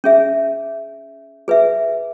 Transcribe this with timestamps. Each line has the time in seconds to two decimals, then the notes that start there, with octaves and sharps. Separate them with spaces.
0.04 C#4 G#4 E5
1.48 G#4 B4 E5